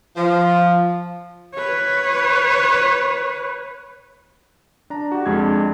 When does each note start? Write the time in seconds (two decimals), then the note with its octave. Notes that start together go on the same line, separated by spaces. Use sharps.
0.17 F3
1.54 B4 C#5
4.90 D4 A#5
5.12 F#4 G4
5.26 F2 G#3 D4 G#6